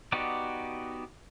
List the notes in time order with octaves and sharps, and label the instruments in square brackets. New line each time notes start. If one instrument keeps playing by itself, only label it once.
[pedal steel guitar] B3 D#4 F#4 G4 D5